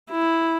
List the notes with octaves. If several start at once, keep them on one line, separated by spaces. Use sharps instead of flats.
E4